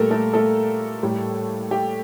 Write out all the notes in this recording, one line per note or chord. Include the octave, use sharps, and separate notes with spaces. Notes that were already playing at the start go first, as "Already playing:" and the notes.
Already playing: A#2 G3 A3 A4 A#4
A3 A4
A3 A4
A2 G3
G4